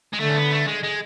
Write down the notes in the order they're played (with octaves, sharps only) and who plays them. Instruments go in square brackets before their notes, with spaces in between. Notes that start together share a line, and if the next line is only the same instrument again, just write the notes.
[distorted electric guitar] G#3
[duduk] D3 [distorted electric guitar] A3
[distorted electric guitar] C#4
B3
A3
G#3
G#3